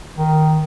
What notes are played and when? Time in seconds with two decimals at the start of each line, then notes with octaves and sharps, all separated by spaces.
0.18 D#3